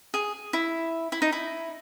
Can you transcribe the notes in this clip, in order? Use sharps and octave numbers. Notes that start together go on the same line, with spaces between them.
G#4
E4
E4
D#4
E4